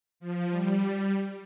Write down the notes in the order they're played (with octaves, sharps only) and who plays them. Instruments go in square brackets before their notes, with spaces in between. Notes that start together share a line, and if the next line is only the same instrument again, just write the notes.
[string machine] F3
G3